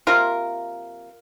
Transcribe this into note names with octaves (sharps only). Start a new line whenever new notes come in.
C3 F3 A#3 F4 A#4